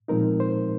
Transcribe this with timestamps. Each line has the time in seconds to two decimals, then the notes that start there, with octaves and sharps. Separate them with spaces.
0.08 A#2 F3 G#3 C4 D#4 A#4
0.40 C5